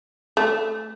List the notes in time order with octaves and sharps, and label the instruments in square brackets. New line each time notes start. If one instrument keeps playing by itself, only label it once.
[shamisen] A3